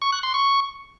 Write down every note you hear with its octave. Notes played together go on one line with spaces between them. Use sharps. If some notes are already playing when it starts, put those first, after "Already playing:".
C#6
F#6
C6
C#6